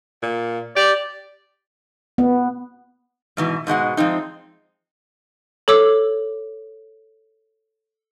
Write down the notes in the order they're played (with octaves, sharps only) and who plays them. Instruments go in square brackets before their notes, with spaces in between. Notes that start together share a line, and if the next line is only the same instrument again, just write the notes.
[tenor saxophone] A#2
[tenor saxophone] G4 [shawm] D5
[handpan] B3
[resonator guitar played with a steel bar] G#2 B2 E3
G#2 B2 G#3 F#5
F3 G#3 C4 D#4
[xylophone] A4 C#5 D6 E6